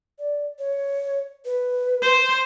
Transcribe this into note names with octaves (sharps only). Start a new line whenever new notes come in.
D5
C#5
B4
C5